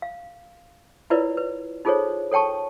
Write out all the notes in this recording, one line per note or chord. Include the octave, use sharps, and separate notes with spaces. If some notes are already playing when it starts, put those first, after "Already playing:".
F5
E4 F4 A#4 B4 C#5 D5
B4
D#4 F4 G#4 A4 C5 C#5
A4 C#5 G5 A5 C#6